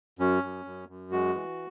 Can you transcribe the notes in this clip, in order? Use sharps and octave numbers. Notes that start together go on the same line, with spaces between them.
F#2 C#4
F#2
F#2
F#2
G#3 F#4
E3